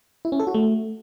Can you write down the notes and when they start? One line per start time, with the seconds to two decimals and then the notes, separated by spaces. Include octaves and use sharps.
0.25 E4
0.32 C#4
0.40 A4
0.47 F#4
0.54 A3